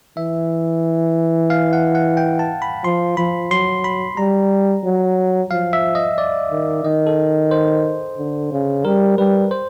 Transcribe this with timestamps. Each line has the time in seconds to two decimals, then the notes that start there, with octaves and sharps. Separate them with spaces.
0.17 E3 E5
1.50 F5
1.73 F#5
1.95 F#5
2.17 G5
2.39 A5
2.62 B5
2.84 F3 C6
3.17 F3 B5
3.51 F#3 C6
3.84 B5
4.17 G3 A#5
4.85 F#3
5.51 F3 F5
5.73 E5
5.95 D#5
6.18 D5
6.51 D#3
6.84 D#3 D#5
7.07 A4
7.51 C5
8.18 D3
8.52 C#3
8.85 G3 A#4
9.18 G3 B4
9.51 C5